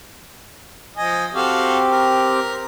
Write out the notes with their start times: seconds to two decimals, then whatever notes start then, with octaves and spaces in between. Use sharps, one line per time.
0.97 F3 D#5 G#5
1.34 C4 F#4 G4 A4 F5
1.88 A#4